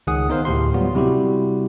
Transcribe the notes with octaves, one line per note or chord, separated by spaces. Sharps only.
C#2 D#3 G#4 F#5 D#6
B3 D#4 A#4 C5 F5
D2 A2 G4 C6
F#3 G3 B3 F4 F#4
C3 G3 E4 F#4 G4